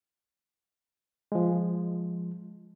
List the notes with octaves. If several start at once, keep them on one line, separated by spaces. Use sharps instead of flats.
F3 G#3